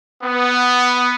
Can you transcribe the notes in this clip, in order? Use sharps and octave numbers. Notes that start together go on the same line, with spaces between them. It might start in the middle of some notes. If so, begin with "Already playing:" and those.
B3